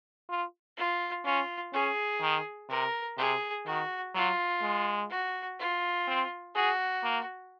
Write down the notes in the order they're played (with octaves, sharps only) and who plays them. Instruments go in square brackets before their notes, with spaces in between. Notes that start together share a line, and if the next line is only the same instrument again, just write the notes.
[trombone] F4
[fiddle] F4
[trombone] C#4 [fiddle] F4
[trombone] C#4 [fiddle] G#4
[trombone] D#3
[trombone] C3 [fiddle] A#4
[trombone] C3 [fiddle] G#4
[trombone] D#3 [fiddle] F#4
[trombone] F#3 [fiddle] F4
[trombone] G#3
[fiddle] F#4
F4
[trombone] C4
[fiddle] F#4 [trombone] G#4
[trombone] A#3